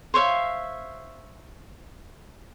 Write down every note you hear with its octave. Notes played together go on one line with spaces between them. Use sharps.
C5 C#5 E5 F5